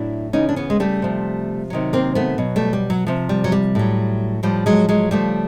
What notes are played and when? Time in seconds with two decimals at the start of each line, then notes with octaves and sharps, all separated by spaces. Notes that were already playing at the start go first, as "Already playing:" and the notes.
Already playing: A2 F#3 D4 E4
0.33 C#3 E3 C#4 D#4
0.49 D4
0.56 B3 C#4
0.70 G#3
0.80 G3 A3
1.02 C3 F3
1.70 C3 D#3 F#3
1.93 A#3 C4
2.15 A3 B3
2.38 B2 F#3
2.56 G3 A3
2.73 G3
2.90 F#3
3.06 C3 F3
3.29 G3
3.44 F#3
3.52 G3
3.75 A2 F#3
4.43 A2 F3 G3
4.66 F#3 G#3
4.89 F#3 G#3
5.11 C#3 F3 G3 A3